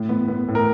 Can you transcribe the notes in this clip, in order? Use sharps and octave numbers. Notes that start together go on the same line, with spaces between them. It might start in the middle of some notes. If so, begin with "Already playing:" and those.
Already playing: A2
B3
B3
A2
A#4